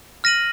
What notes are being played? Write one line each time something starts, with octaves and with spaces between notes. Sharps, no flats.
F6 A#6 D#7 F#7